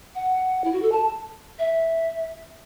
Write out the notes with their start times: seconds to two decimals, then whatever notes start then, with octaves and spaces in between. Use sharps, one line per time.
0.15 F#5
0.64 E4
0.73 F#4
0.82 A4
0.92 A5
1.59 E5